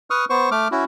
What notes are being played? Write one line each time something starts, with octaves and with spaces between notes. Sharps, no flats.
B4 C#6 D#6 F6
B3 C5 C#6
A3 D6 F6
C#4 E4 F#4